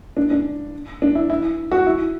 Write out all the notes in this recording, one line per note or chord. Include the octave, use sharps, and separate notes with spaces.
D4
D4
D4
E4
E4
F#4
E4